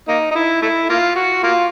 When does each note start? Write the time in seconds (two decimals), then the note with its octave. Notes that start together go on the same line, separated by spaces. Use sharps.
0.08 A#3 D#4
0.31 D#4
0.35 E4
0.62 A3 E4
0.90 A#3 F4
1.16 F#4
1.43 A#3 F4